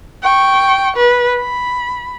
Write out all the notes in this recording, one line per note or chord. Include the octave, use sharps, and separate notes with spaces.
G5 C#6
B4
B5